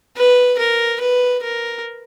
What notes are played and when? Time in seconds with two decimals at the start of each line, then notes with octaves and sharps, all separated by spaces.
0.17 B4
0.59 A#4
1.01 B4
1.43 A#4